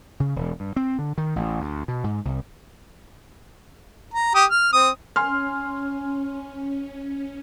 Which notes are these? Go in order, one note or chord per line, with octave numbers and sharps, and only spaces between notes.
C#3
E1
G2
C4
D3
D#3
A1
D2
B2
G#2
C2
A#5
G4 D#6
F6
C4 D#6
C#4 G#5 C6 F6